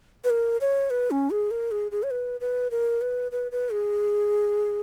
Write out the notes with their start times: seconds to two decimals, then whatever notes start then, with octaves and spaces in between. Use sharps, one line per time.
0.24 B4
0.30 A#4
0.61 C#5
0.90 B4
1.11 C#4
1.31 G#4
1.51 A#4
1.71 G#4
1.91 G#4
2.03 C#5
2.11 B4
2.41 B4
2.71 A#4
3.01 B4
3.32 B4
3.52 B4
3.72 G#4